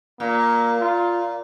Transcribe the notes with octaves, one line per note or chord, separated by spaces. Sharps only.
A#2 A#3
F4